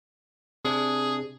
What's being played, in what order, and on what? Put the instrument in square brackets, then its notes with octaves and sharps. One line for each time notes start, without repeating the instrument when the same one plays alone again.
[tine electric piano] C3 D4 [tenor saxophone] G#4